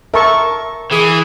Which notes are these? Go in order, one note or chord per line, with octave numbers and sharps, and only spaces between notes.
A#4 E5 A5 C#6
E3 G#4